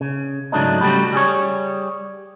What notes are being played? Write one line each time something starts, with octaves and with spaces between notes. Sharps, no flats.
C#3
G#2 C#3 F#3 A3 D4 D#4
C#3 G3 A3 F#4 G4 B5
G3 G#4 C#5